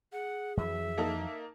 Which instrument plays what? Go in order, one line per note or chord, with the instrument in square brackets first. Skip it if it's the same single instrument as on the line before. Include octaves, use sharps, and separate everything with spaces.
[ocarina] G#4 [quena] F#5
[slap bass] F2 E3 F#3 [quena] E5
[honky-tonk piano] A#3 D#4 A4